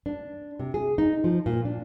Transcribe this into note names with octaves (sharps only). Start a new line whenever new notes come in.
D4
C3
G#4
D#4
F3
A#2
D4